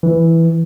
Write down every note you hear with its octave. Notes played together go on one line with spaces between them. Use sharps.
E3